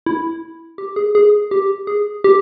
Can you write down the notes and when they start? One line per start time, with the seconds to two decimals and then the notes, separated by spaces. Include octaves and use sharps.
0.06 E4
0.78 G4
0.96 G#4
1.15 G#4
1.51 G4
1.87 G#4
2.24 G4